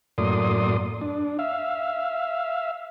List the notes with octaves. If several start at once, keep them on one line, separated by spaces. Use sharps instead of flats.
F#2 A2 A#3 D5 C6 D#6
D4
E5 F5